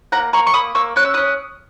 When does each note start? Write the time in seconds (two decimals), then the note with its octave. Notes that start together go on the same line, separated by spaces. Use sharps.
0.12 A#3 F#5 A#5
0.33 A#3 A#5 C#6
0.47 C#6
0.54 A#3 B5 D#6
0.75 A#3 C#6 E6
0.96 C#4 F#6
1.05 E6
1.14 C#4 D#6 F#6